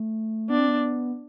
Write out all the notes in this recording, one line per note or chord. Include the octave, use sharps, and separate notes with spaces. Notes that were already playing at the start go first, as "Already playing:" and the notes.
Already playing: A3
B3 D4
C4
B3